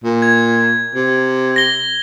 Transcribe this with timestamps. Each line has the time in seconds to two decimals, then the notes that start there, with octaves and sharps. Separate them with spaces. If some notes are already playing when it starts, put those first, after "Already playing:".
0.04 A#2
0.22 G#6
0.95 C3
1.56 A#6 G7